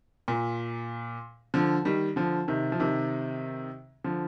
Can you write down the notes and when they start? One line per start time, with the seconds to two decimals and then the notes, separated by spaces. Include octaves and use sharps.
0.28 A#2
1.54 D3 F3
1.85 D#3 G3
2.16 D3 F3
2.48 C3 D#3
2.72 F3
2.80 C3 D#3
4.04 D3 F3